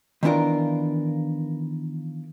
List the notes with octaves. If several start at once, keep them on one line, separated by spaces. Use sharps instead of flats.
D#3 E3 B3 D4 F4 A#4